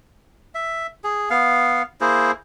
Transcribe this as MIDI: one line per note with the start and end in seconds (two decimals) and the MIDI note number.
0.55 0.87 76
1.04 1.29 68
1.30 1.82 59
1.30 1.82 77
2.01 2.31 58
2.01 2.31 64
2.01 2.31 68
2.01 2.31 72